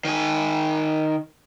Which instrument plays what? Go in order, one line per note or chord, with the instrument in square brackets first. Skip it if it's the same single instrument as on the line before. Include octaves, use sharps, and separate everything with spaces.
[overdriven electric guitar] D#3 G#5